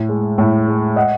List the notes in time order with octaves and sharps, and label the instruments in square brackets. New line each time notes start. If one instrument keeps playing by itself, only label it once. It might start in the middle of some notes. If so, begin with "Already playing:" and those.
Already playing: [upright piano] A2
G#3
A2
G#3
D#5 F#5